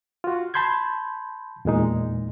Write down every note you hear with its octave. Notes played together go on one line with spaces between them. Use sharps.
F4 F#4
A5 B5 C6 G6 G#6
E2 A#2 G#3 D#4